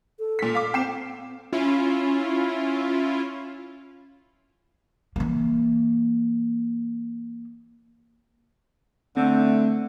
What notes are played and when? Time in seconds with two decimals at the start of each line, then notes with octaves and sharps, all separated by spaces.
0.19 A4
0.39 A#2 B6
0.55 F5 D6
0.74 C4 G5 C7 E7
1.53 C#4 E4 F4
5.16 E3 A#3
9.17 D3 A3 C4